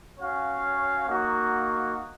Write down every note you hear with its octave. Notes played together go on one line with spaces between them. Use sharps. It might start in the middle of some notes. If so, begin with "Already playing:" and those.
C#4 F#4 C#5 F5
A#3 D#4 F#4